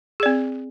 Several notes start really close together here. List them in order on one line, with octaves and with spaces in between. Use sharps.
G#4 D5 C4